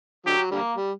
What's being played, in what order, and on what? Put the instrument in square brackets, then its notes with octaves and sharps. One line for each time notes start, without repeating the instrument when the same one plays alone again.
[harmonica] D3 F#3 [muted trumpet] G4
[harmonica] D3 G3 A#3
G3